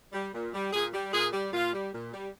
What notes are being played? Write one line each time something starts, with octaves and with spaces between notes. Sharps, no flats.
G3
A#2
G3
A#2 G#4
G3
A#2 G#4
G3
A#2 F4
G3
A#2
G3